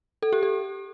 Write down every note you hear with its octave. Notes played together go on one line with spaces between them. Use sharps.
A4
G4
A4